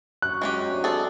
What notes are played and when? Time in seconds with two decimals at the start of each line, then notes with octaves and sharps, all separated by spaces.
0.22 F#2 C#5 F#6
0.42 G#3 C#4 D#4 G4
0.55 A#5
0.70 C3 D4
0.84 C3 C4 D4 G#4 A4